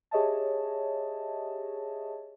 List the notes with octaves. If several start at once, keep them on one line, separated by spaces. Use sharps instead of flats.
G4 G#4 C#5 D#5 E5 A5